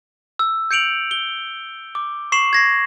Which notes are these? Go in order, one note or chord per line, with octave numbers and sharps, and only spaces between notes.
E6
G6 C#7 D7 F7 F#7
G7
D6
C#6 C7 E7 F#7
G#6 A#6 C7